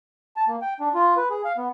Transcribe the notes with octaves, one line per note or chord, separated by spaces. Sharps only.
A5
A#3
G5
D4
F4
B4
G#4
F5
B3